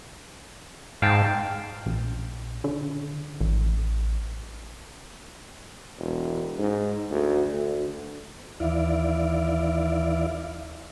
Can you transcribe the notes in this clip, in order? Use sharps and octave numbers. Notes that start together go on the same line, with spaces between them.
G#2 F5 G5 A5
A#1
D3
A1
E1
G#2
D2
D2
D#2 E3 E4 D5 F5